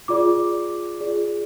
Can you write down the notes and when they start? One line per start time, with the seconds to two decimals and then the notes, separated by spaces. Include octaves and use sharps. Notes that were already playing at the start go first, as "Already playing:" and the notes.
0.08 F4 G#4 D5 D6
1.00 F4 G#4 D5